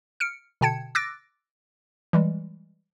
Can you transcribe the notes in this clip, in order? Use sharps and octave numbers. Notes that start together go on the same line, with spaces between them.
F6 C#7 D7
B2 D3 G5 A5 G#6 C#7
D6 E6 F#6 A6 A#6 D7
E3 G3 G#3